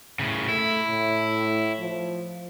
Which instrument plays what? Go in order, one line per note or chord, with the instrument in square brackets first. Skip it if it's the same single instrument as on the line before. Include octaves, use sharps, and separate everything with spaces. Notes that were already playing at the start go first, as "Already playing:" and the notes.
[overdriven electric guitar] A2 C#3
[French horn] A3 [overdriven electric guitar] E4
[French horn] A2
F3